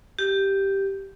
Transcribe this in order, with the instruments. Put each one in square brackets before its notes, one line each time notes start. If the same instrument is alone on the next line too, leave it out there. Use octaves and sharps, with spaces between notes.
[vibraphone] G4